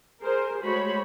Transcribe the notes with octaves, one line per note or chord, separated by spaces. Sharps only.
G#4 A#4 C5
G#3 A3 F#4 C5 C#5 B5